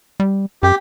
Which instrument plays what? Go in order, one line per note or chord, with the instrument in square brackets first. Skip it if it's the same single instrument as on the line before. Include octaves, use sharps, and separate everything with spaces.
[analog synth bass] G3
[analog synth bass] F#2 [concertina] G4